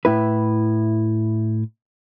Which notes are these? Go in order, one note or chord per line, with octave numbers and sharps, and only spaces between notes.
A2 E4 B4